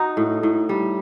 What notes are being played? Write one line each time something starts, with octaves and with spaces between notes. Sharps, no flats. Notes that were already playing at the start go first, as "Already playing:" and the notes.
Already playing: D#4 F#4
A2
A2
G3